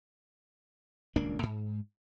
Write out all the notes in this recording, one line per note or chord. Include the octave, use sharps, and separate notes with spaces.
D#1 C#2 A#3 D4
G#2